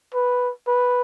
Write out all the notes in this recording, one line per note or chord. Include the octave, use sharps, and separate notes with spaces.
B4
B4